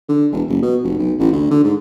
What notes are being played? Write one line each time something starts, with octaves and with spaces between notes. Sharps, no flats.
D3
E1
F#1
B2
F1
B1
A1
D2
D3
G#2